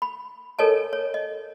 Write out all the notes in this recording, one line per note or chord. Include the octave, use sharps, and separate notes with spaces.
B5
A4 A#4 C#5 D#5 G#5 A5
C#5
D#5